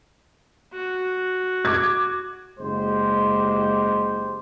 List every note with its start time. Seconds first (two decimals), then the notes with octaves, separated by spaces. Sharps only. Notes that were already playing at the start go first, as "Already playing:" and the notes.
0.74 F#4
1.65 D6 G#6
2.59 F#1 G#3 G4 C5